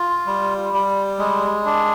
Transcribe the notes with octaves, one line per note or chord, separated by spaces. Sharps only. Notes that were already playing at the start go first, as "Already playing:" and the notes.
Already playing: F4
G3
G3
G#3
D4